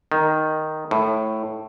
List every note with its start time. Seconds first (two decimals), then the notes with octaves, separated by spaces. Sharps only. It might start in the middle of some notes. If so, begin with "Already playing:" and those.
0.12 D#3
0.91 A2